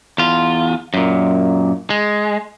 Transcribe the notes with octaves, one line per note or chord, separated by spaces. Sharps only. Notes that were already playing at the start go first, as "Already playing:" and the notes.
E2 F4
F#2 A#2
G#3